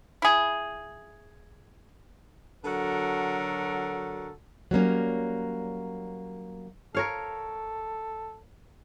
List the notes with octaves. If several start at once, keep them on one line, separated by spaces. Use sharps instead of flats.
E4 G#4
D3 F#3 F#4 A4 A#4
F#3 G3 A#3 C#4
A4 A#4 C#5 F5